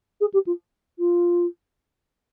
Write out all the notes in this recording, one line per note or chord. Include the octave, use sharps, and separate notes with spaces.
G#4
G4
F4
F4